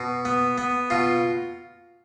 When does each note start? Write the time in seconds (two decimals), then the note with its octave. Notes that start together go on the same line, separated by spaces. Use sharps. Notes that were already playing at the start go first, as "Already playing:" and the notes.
Already playing: B2
0.25 B3
0.58 B3
0.90 B2 F4